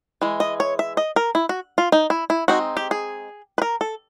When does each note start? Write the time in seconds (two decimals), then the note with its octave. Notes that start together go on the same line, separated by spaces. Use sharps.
0.22 E3 G#3
0.40 D#5
0.60 C#5
0.79 E5
0.97 D#5
1.16 A#4
1.35 E4
1.49 F#4
1.78 F4
1.92 D#4
2.10 E4
2.30 E4
2.48 G#3 C4 D#4 F#4
2.77 G4
2.91 G#4
3.58 B4
3.62 A#4
3.81 A4